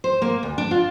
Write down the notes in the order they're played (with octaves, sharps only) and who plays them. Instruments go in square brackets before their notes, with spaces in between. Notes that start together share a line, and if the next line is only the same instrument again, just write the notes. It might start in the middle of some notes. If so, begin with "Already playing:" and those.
[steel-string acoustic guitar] C5
A#3
D2
D4
F4